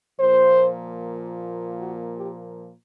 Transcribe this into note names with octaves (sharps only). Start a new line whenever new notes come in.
A#2 F3 A#3 C5
F#4
G4